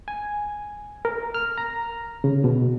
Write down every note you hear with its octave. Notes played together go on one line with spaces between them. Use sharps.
G#5
A#4
F6
A#5
C#3
B2